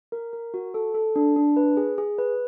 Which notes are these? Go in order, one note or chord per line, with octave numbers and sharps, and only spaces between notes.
A#4
A#4
F#4
A4
A4
D4
D4
B4
G#4
G#4
B4